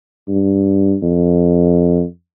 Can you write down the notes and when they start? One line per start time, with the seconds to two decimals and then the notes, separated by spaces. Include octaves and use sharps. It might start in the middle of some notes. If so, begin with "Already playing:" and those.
0.28 G2
1.02 F2